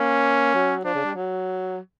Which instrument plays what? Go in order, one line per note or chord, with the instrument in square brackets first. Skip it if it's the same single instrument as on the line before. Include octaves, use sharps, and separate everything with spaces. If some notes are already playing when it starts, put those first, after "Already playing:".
Already playing: [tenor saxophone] A#3 [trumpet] C#4
[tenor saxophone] F#3
[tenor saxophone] F3 [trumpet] D4
[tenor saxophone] C#3
G3
F#3